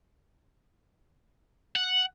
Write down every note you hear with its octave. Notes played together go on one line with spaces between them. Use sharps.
F#5